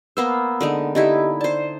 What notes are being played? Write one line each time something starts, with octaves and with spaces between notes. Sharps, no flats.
A#3 B3 C5 E6
D3 G#3 D#4
D3 D#4 E4 G4 D#5
C5 D5 A5